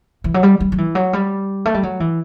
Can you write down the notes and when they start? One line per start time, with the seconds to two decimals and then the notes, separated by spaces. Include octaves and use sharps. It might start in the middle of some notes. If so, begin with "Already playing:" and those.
0.24 E3
0.34 F#3
0.43 G3
0.60 G3
0.72 F#3
0.78 E3
0.95 F#3
1.13 G3
1.65 A3
1.74 G3
1.83 F#3
2.00 E3